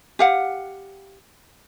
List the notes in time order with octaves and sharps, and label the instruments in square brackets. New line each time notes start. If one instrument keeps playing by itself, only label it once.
[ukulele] G4 F5 F#5